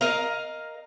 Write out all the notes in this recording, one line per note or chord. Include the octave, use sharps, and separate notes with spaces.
A#4 D#5 F5 A#5